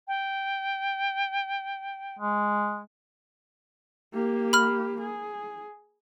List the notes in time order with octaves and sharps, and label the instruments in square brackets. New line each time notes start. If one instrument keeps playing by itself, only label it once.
[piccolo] G5
[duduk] G#3
[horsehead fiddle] A#3 G4
[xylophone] B5 F6
[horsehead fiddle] G#4